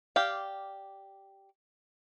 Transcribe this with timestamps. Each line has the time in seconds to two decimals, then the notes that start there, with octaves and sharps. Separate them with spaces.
0.16 G4 D5 F5